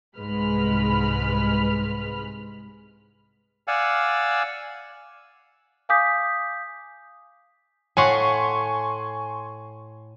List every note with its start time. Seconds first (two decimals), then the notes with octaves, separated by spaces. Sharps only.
0.18 C2 G#2 G#3 B4 B5 F6
3.68 D5 F5 F#5 G#5 E6
5.89 F5 G#5 D6 D#6 G6 B6
7.97 A2 F5 F#5 G#5 C6 C#6